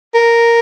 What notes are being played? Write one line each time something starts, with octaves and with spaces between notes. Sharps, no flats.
A#4